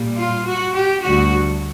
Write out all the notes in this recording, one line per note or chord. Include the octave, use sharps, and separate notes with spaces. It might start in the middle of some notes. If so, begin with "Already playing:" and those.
Already playing: A#2 G3
F4
F#4
G4
D2 D3 G3 F#4